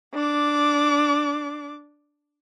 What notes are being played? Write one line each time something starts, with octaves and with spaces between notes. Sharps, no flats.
D4 D6